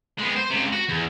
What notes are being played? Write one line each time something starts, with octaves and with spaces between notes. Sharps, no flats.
G#3 B3
C5
C#2 C3
F#4
E2